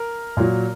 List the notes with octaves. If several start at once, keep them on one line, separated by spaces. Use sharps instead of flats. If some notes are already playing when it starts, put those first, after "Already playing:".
Already playing: A#4
A#2 F#3